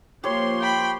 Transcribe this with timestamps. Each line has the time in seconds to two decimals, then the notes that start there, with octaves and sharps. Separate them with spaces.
0.24 F3 A#3 G4 C#5 C6
0.60 G5 B5